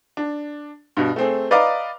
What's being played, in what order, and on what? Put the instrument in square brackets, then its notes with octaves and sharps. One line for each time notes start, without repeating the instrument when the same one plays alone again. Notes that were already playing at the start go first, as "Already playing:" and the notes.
[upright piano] D4
G2 B2
A3 C4 G#4
B4 D5 D#5 F5 A#5 D6